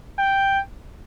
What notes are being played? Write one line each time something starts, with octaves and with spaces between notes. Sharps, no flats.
G5